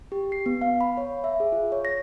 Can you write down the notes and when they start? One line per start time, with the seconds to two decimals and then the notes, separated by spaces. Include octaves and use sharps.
0.12 G4
0.32 C7
0.46 B3
0.61 F5
0.81 B5
0.97 C#5
1.24 E5
1.40 G#4
1.52 F4
1.72 C#5
1.85 A#6